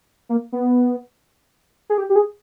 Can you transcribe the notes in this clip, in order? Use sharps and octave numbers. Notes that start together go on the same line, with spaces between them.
A#3
B3
G#4
G4
G4
G#4